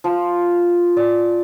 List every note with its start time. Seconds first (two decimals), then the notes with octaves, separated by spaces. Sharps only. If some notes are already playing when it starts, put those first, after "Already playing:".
0.04 F3
0.97 D5